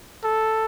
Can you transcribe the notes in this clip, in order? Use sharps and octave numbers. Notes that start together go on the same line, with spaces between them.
A4